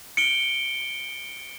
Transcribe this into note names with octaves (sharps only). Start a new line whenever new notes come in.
C#7 D7 G7